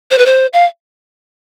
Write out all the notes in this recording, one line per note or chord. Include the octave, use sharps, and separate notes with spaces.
C5
B4
C5
F5